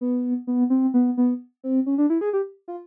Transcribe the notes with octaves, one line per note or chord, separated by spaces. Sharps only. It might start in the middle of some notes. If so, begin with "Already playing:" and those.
B3
B3
C4
B3
B3
C4
C#4
D4
E4
G#4
G4
F4